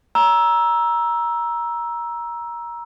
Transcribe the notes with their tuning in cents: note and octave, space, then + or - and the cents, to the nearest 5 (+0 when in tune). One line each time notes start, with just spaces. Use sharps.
A#5 +20 E6 +0